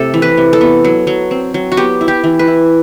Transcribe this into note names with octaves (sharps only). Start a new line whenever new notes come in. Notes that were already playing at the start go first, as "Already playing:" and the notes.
Already playing: C3 A3 A4
E3
B4
C3
A4
B3
F#3
F#3
C4
F#3
F#4
B3 G4
E4
G4
E3
B4
E4